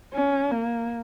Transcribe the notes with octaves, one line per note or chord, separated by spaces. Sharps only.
C#4
A#3